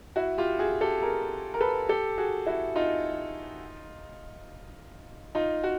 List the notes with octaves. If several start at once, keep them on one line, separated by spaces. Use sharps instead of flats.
E4 F#4
F4 G4
F#4 G#4
G4 A4
G#4 A#4
A#4
A4 B4
G4 A4
F#4 G#4
E4 F#4
D#4 F4
D#4 F4
F#4